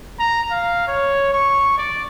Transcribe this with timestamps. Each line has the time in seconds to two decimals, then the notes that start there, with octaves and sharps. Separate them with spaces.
0.19 A#5
0.51 F5
0.87 C#5
1.33 C#6
1.78 D5